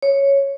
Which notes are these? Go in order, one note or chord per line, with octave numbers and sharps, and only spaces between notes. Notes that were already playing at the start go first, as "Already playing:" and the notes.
C#5